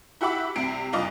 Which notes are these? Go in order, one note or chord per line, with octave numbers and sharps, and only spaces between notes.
E4 F#4 G4 E5 B5 D6
C2 C3 C7 D7
F#1 G2 F4 D#5 D6